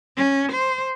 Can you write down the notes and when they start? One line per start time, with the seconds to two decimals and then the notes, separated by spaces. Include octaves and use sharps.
0.17 C#4
0.51 C5